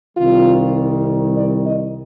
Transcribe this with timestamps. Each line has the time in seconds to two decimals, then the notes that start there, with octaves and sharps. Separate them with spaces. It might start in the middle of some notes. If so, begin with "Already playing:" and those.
0.17 C2 C3 D#3 G3 F4
1.37 D5
1.66 D#5